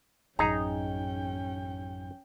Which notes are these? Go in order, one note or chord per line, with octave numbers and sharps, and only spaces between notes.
A1 F#2 C#4 D#4 G#4 G5 A#5